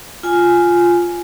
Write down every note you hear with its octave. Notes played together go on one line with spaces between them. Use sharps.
F4 G#5